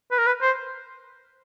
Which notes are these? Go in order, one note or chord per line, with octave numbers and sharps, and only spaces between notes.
B4
A#4
B4
C5